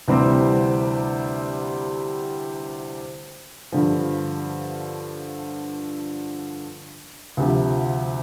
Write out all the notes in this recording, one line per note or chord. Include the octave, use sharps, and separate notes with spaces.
D2 C3 E3 G3 C4
G2 D3 F3
D2 C3 F3